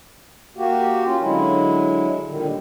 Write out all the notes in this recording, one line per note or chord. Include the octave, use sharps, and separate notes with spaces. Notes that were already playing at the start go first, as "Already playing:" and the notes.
A#3 F#4 G4
C#4 F4
D3 F#3 G#3 E4
A#2 D3 D#3 G3